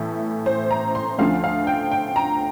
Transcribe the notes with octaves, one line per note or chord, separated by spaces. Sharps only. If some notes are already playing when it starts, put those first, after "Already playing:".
Already playing: A2 E3 A3
C5
A#5
C6
D2 D3 F3 A3 F5
F5
G5
G5
A#5